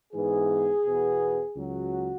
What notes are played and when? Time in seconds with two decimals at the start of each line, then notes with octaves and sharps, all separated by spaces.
0.13 G#2 E3 B3 G#4
0.85 E2 B2 B3
1.56 C#2 C#3 F#3 F#4